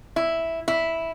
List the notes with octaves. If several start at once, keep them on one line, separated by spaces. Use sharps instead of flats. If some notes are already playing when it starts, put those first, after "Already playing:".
E4
E4